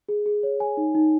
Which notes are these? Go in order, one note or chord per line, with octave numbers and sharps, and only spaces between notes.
G#4
G#4
C#5
G#5
D#4
D#4